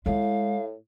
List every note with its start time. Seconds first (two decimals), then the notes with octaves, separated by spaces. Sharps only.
0.06 A2 G#3 E4 F5